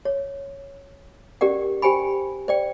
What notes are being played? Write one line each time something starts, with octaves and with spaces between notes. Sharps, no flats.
C#5
C#4 G4 A#4 D5 F#5
G4 C5 G5 G#5 B5
C5 D5 G5